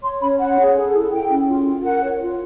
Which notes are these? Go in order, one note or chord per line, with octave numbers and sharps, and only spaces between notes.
C#5 C6
C#4 B5
C#5 F#5
G#4
A4
E4
E4 G5
C#4
F4
F4
A#4 F#5
C#5
F4